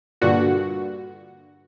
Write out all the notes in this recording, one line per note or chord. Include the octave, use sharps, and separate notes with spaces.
G2 A#2 D3 F#4